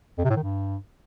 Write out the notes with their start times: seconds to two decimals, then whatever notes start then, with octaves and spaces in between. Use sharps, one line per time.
0.18 F2
0.24 C3
0.30 A2
0.37 D#3
0.43 G2